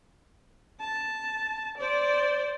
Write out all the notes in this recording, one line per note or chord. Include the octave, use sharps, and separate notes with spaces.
A5
C5 D5